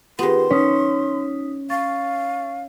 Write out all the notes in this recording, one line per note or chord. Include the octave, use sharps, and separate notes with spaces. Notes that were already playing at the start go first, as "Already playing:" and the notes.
D#3 B3 F4 G4 G#4 C6
C#4 D#4 D#6 B6
F5 C#6 A6